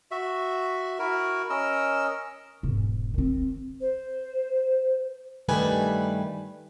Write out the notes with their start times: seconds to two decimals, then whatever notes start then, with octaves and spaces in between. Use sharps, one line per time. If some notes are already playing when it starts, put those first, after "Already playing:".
0.11 F#4 E5
0.99 E4 F#4 A#4
1.50 C#4 A#4 D#5 E6
2.63 E1 G#2
3.14 D#3 C4
3.81 C5
5.49 G2 D#3 G3 A3 B4 G#5